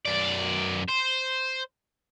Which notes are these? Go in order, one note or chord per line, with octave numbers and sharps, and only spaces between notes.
F#2 D5
C5